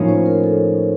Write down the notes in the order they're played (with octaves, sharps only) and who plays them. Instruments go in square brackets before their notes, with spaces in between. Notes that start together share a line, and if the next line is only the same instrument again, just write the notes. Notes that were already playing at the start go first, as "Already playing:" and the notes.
Already playing: [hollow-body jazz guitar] A2 F3 A#3 C#4 [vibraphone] D#4 C#5
[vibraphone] C5
A#4
A4